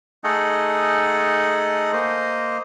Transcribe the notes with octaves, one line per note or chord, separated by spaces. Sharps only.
A3 D#4 G#4 A4 D#5 F#5
A#3 C5 D#5